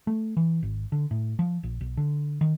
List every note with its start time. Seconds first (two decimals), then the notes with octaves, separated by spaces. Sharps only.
0.07 A3
0.37 E3
0.63 G#1
0.92 D3
1.11 A2
1.39 F3
1.63 A#1
1.81 B1
1.97 D3
2.41 D#3